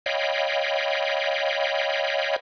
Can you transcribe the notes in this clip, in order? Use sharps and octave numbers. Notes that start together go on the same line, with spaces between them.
C#5 D#5 F5 G5 B5